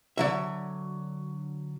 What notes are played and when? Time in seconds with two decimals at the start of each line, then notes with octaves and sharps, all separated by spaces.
0.18 D3 F#3 E5